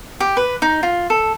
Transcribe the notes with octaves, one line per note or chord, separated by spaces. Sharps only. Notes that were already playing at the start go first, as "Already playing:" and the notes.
G4
B4
D#4
F4
A4